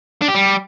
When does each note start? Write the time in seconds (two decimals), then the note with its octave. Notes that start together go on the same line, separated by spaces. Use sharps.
0.22 D4
0.28 G4
0.35 G3